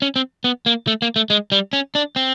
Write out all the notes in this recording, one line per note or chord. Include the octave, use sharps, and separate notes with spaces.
C#4
C4
B3
A#3
A3
A#3
A3
G#3
G3
C#4
D4
C4